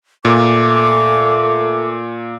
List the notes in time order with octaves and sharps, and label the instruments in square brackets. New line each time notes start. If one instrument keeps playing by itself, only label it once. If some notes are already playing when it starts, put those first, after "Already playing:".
[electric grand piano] A#2 [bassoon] A3 [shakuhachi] D6